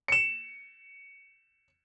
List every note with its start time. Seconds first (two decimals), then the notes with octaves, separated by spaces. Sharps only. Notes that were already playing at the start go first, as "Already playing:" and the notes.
0.08 C#7 E7